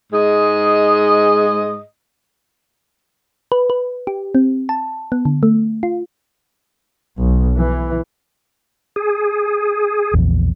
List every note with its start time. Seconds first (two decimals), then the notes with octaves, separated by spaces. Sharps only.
0.13 G#2 G#3 D#5
3.52 B4
3.70 B4
4.07 G4
4.35 C4
4.69 A5
5.12 B3
5.25 D3
5.43 A3
5.83 F4
7.18 B1
7.57 E3
8.96 G#4
10.14 A#1 E2